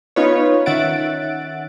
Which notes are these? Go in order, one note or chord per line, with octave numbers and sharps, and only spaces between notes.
B3 C#4 D#4 F4 B4 C#5
D#3 C#4 E5 F#5 A6 D7